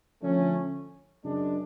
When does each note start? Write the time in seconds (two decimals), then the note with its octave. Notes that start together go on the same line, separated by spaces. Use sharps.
0.22 D3 F3 A3 C#4
1.23 F#2 C#3 G#3 D4